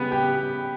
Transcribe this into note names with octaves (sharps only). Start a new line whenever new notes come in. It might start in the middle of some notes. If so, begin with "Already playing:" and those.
Already playing: C#3 G3 B3 B4
G4 G5